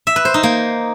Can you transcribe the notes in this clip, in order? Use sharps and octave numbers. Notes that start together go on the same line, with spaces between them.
E5
B4
C5
D#4
A#3